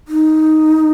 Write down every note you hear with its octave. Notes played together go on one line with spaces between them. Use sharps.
D#4